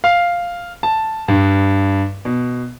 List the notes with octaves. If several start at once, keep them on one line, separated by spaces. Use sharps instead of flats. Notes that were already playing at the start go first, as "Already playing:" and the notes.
F5
A5
G2
B2